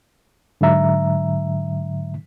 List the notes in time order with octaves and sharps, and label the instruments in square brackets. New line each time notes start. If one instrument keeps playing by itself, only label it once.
[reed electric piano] G#2 D3 F#3 E5 A#5